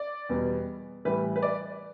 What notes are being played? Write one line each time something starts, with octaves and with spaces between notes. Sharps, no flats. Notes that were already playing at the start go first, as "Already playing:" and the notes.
Already playing: D5
E2 B2 G3
A2 E3 G3 B4
B4
D5